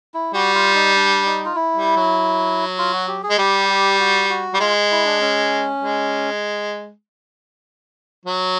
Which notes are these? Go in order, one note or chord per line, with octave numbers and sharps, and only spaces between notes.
E4
G3 F#4
F4
D#4
D4
D#4
F4
E4
G3
F#3
F4
F#4
G4
G#4
G#3
G3 G4
G4
F#4
F#4
G3
G#3 F4
E4
D4
C#4
G#3
F#3